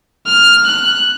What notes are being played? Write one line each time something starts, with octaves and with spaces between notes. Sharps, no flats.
F6
F#6